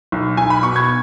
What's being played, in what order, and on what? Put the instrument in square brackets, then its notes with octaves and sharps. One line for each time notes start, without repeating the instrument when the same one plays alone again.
[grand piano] B1
B1 G#5
B5
B2 C#6
G#6